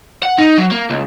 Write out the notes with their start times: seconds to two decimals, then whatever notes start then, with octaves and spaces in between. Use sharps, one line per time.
0.23 F#5
0.38 D#4
0.58 F#3
0.71 A#3
0.90 C#2